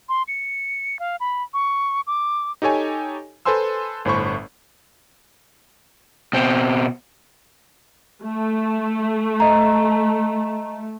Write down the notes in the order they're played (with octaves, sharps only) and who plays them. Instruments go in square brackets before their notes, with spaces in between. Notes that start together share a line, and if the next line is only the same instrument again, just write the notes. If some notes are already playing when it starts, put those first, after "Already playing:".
[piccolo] C6
C#7
F5
B5
C#6
D6
[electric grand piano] D#4 G4 A4 C#5 G#5
A4 B4 C5 G#5 C6 E6
G1 A2 C5 B5 C#6
[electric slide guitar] B2 C4
[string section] A3
[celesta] D#5 A#5